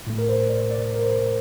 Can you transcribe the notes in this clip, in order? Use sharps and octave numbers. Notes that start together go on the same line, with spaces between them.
A2 A3
A#4
C5
D5
D5
A#4
C5